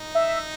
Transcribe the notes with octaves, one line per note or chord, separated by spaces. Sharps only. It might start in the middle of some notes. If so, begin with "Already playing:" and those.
Already playing: D#4
E5